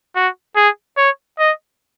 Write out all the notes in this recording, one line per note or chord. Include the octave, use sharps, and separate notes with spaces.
F#4
G#4
C#5
D#5